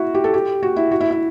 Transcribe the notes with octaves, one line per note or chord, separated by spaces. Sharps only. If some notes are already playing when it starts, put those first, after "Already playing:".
Already playing: E4 F#4
G4
A4
G4
F#4
E4
F#4
E4
E4